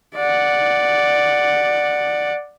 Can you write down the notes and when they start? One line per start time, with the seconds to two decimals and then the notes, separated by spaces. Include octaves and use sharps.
0.16 D5 F#5